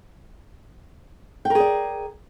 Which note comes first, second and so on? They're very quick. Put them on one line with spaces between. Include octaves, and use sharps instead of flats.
G5 A#4 G#4 D5